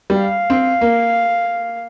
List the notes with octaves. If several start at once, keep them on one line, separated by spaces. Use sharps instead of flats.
G3
F5
C4
A#3